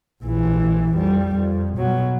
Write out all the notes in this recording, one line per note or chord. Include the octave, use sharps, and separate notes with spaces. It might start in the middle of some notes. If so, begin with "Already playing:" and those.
A#1 E3
F2 G3
F2
B2 F#3